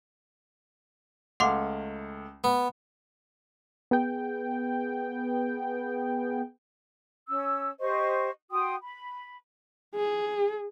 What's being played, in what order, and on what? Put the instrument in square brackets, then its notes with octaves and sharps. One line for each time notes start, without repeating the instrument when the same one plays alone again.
[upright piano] C#2 A3 F5 [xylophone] F#5 C6 D6
[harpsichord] B3
[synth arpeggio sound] B3 G#4 G5
[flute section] C#4 E6
G4 C5 D#5 C#6
F#4 G5 C6 D#6
B5
[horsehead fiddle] G#4